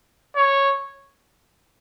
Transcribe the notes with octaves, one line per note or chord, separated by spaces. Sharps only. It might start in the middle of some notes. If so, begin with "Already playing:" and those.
C#5